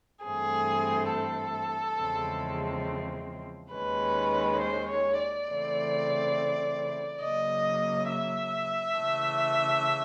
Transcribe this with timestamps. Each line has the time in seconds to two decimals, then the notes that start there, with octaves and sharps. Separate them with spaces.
0.24 G2 E3 A3 C4 G#4
1.12 A4
1.98 E2 C#3 F3 G#3 C4
3.73 D#2 D#3 G#3 C#4 B4
4.61 C5
4.89 C#5
5.19 D5
5.47 C#3 E3 A3 C4
7.22 C#3 F#3 A#3 D#5
8.09 E5
8.96 C#3 E3 A3